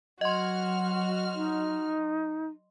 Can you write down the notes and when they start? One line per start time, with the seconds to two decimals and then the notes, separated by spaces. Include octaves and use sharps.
0.21 F#3 F#4 D#5 F#5 C6 F6
1.35 D#4